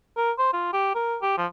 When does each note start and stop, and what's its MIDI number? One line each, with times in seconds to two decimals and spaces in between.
0.17 0.32 70
0.39 0.52 72
0.53 0.69 65
0.73 0.94 67
0.95 1.17 70
1.22 1.34 67
1.38 1.46 53